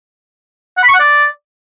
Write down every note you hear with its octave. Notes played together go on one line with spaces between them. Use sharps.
F#5
B5
C#6
F#5
D5